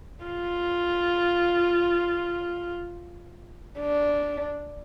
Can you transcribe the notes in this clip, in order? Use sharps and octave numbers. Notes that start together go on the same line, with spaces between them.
F4
D4